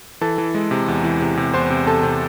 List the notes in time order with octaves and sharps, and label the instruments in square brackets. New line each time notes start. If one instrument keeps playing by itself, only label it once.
[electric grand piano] E3 A4 A5
E3
G#3
C3
E2
E3
C3
C3
E2 C5 C6
C3
C3 A4 A5
C3